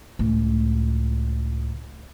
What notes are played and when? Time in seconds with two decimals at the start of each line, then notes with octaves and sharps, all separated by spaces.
0.19 C#2 A2